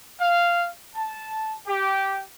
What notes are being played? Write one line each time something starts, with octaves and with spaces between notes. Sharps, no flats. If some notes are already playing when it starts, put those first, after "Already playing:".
F5
A5
G4